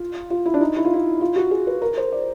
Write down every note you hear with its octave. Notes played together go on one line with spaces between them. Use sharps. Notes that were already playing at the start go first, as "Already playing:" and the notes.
Already playing: F4
F4
E4
D4
D#4
E4
F4
E4
F4
F#4
G#4
B4
A#4
C5
D5